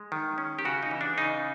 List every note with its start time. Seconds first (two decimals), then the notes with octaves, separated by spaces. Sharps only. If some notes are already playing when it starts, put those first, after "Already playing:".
Already playing: G#3
0.12 D#3
0.38 C#4
0.59 G4
0.65 C#3 F#4
0.83 D#4
0.91 E3
1.01 D4
1.18 C#3 D#4